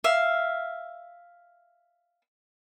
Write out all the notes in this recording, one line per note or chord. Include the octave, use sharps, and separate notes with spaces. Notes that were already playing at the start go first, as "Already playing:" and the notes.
E5 F5